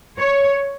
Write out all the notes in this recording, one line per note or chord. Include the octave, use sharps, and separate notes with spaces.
C#5